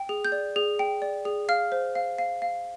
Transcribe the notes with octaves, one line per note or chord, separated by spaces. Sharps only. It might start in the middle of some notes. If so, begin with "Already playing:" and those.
Already playing: G5
G#4
G6
D5
G#4
G5
D5
G#4
F5 F6
C5
F5
F5
F5